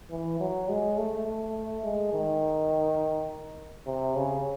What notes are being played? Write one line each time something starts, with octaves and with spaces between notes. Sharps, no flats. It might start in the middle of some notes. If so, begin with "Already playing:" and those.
E3
F#3
G#3
A3
A3
G#3
D#3
C3
C#3